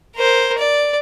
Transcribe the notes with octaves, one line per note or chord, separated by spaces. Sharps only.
A#4 C5
D5